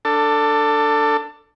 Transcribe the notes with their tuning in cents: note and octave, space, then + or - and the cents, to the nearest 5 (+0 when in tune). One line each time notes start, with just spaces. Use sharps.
D4 +0 A4 +20